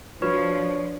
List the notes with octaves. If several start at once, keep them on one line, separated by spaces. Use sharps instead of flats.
F3 D4 F4 F#4 B4 C#5